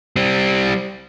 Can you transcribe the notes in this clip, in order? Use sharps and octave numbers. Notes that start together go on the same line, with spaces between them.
G3 C4